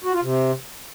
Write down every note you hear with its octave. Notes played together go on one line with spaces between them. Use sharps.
F#4
F4
C3